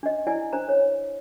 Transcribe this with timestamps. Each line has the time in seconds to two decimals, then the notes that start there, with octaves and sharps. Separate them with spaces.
0.03 D4 D#5
0.27 E4 D5 G#5
0.53 D4 C5 A#5
0.69 C#5